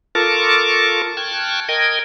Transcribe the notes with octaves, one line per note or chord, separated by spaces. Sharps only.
F4 A4 A#4 A5 C#6 D6
G5 A5 C#6 F6 F#6 G#6
A#4 D#5 G5 G#6